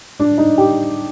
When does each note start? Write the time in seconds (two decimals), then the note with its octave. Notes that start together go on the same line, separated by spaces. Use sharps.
0.20 D4
0.38 D#4
0.58 G4